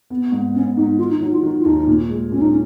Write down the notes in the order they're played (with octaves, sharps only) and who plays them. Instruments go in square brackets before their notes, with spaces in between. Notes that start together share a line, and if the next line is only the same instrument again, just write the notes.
[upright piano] B3
G#2
[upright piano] B3 [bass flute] C#4
[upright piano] G#2 [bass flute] D#4
[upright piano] D#3 [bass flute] F4
[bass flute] D#4
[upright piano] F#3 [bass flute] D#4
[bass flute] F4
[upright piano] D#3 [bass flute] D#4
[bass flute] F4
[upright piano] D#2 [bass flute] D#4
[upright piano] A#2
G#3
[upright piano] A#2 [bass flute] C#4
[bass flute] D#4
C#4